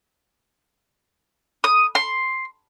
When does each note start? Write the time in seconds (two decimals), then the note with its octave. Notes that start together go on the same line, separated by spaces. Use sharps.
1.64 D#6
1.95 C6